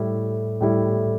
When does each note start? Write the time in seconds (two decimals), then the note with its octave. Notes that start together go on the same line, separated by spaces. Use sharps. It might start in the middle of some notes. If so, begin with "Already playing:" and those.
Already playing: A2 G3 E4
0.61 A2 G3 E4